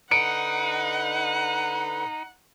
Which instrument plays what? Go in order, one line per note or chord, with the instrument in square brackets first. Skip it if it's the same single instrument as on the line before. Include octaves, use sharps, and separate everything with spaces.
[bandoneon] D3 B4 [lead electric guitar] D#4 [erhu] F#5 [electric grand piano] C#7 D7